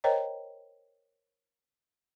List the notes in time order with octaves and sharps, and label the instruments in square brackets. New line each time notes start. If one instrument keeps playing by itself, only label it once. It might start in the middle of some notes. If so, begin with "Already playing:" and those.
[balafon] A#4 C5 C#5 D#5 G5 A#5